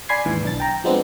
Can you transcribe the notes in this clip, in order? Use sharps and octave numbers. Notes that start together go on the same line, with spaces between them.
D5 G#5 B5 C6 G#6 C7
D#2 G#2 E3
B1 D4 A6
G5 A#5
F3 G#3 B3 C4 D4